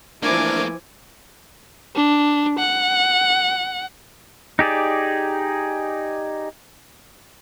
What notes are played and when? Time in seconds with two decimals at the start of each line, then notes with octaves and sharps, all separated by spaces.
0.23 E3 F3 A3 A#3 D4 A#4 G#5 D6
1.96 D4
2.59 F#5
4.59 D#4 G4 G#4 D5